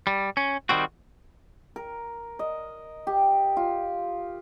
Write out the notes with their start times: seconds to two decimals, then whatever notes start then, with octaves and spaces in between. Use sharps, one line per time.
0.07 G3
0.37 C#4
0.69 D#3 G3 C4 F#4
1.76 A#4
2.39 D#5
3.07 G4
3.57 F4